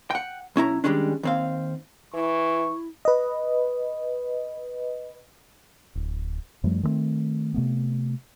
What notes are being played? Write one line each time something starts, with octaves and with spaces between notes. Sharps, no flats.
F#5 G5
B1 C#4 E4 A#5
D#3 F3 G3 G#3 C#4 D4
D#2 C4 F5
E3 E4 C#6
B4 D#5
D1
F#2 F3 G3 A3
D#3 G#3 A3 C4
C3 A3 B3